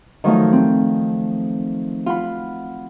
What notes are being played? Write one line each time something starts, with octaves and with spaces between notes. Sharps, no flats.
D#3 F3 F#3 A3 D#4
C4
F4 F#5 B5